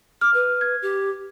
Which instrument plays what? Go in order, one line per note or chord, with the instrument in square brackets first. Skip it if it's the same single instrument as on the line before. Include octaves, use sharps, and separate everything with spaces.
[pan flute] D6 [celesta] F6
[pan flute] B4
[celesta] G#6
[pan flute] G4